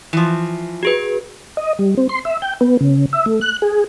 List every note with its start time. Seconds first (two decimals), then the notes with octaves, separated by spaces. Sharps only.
0.13 E3 F3
0.83 F#4 G#4 B4
1.57 D#5
1.79 G3
1.97 C4
2.09 C6
2.25 E5
2.42 G5
2.61 B3
2.81 C#3
3.13 E5
3.26 A3
3.41 F#6
3.62 G#4